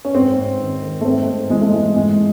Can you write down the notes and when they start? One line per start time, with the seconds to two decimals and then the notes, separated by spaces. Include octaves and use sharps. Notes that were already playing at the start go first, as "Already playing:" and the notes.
0.05 C#4
0.14 G#2 C4
0.37 G#2
0.60 D#3
0.82 D#3
1.01 A3
1.05 G#2 C4
1.28 G#2
1.50 E3 G#3
1.61 A3
1.71 E3 G#3
1.96 G#2 G#3